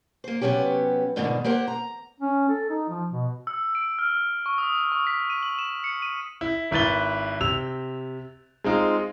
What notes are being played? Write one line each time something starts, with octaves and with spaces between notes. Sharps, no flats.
A#3 C5
C3 F#3 B3 C#4 G4
F2 G#2 B2 D3 D#3
A#3 G4 A#4 C5 F#5
A#5
C#4
A4
D#4
F3
B2
E6
D7
F6
C#6
D#6
C#6
B6
D#7
F#7
E7
C#7
D#7
E4
G#1 E4 B4 A6 G7
C3 E6 F7
G#3 C4 D#4 F4